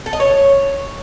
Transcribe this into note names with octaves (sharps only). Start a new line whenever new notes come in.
A4
D#5
C#5